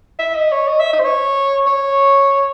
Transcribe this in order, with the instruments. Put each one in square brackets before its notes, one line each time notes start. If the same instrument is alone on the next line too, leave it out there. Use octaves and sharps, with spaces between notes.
[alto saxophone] E5
D#5
C#5
D#5
E5
D#5
C5
C#5
C#5